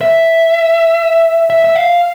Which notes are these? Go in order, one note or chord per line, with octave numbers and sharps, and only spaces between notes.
E5
E5
E5
F5